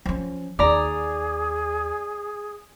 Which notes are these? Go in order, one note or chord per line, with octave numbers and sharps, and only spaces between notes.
F3 C#4
D#2 D#4 G#4 D5 A#5